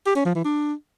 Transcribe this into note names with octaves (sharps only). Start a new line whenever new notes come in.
G4
C#4
F3
E3
D4